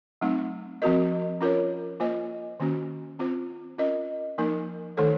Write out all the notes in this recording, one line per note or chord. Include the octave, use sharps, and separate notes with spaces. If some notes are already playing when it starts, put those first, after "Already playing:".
F#3 A3 C4 D#4
F3 C4 F#4 A#4 D#5
C#4 F4 A#4 C#5
A#3 F4 C5 D#5
D#3 A#3 C#4 F#4
C4 F4 C5
C#4 F4 A#4 D#5
F3 A#3 D#4 A#4
D#3 A3 D#4 A4 C#5